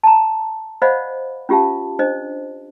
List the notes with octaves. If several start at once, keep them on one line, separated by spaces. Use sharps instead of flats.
A5 A#5
C5 D5 D#5 F5 F#5 B5
C#4 F4 G4 F5 A5
D4 C5 D#5